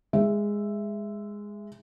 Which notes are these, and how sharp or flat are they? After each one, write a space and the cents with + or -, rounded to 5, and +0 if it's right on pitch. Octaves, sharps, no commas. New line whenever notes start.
G#3 -10 E5 +0